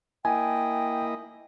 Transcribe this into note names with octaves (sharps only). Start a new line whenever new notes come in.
A#3 E4 D#5 G5 G#5